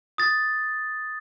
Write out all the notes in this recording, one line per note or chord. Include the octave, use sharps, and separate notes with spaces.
D#6 A6